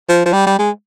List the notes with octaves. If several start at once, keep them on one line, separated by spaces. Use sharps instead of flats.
F3
F3
G3
G3
G#3